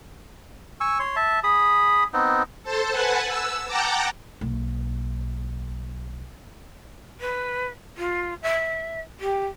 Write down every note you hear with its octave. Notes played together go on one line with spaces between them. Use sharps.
G#5 C#6 E6
C#5 C6
E5 A5
G#4 B5 D#6
B3 C4 D#4
A4 C5 A5
B4 F#5 G#5 A5
E6
F#5 G5 A5 A#5 D6
B1 A#3
B4
F4
E5
G4